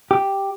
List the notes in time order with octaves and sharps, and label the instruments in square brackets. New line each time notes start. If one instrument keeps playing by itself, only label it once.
[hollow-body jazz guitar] G4